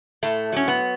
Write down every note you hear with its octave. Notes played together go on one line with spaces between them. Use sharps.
A2 A3
F#3 C#4
B3